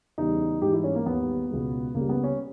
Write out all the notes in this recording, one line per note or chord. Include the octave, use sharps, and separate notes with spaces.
E2 C#3 G3 D#4
G#2 E3 G3 G4
E4
C#4
A#3
D#2 D#3 G3 B3
C#2 B2 G#3
C#2 C#3 G3 A#3
B3
C#4